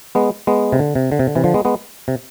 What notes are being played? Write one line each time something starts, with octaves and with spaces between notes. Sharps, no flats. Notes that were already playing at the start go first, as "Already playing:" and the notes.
G#3 B3
G#3 B3
C3
D3
C3
D3
C3
D3
C3 E3
D3 F3
G#3 B3
G#3 B3
C3